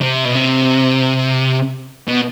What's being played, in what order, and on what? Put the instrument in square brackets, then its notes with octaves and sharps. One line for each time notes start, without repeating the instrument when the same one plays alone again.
[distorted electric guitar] C3
B2
C3
B2